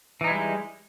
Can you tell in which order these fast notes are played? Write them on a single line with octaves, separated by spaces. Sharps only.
E3 D#4 E4 G3 G#3